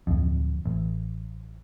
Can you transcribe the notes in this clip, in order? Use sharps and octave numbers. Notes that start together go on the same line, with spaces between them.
D1 F2
A1